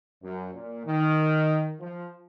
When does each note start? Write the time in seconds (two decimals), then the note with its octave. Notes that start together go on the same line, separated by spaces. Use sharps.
0.22 F#2
0.55 A#2
0.86 D#3
1.80 F3